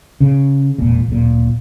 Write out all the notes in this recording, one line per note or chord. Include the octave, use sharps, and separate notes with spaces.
C#3
E1 A#2
D1 A#2